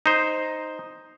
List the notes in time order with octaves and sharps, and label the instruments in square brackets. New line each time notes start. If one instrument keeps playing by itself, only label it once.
[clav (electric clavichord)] D#4 C5